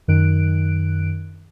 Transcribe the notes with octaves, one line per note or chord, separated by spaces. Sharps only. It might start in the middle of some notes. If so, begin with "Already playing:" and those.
F#2 D#3 F#6 D7